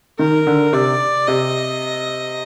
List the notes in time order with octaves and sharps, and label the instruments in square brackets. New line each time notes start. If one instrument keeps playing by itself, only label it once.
[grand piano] D#3 [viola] A#4
[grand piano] D3
[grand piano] C3 [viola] D5
[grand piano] C3 [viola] D#5